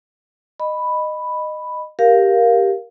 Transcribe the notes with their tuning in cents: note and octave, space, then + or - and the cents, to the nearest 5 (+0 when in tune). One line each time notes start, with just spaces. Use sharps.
D#5 -15 B5 +0
G4 +0 A#4 +5 F5 +0